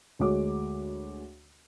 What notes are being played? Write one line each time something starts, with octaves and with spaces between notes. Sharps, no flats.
D2 G#3 F#4 C#5 D6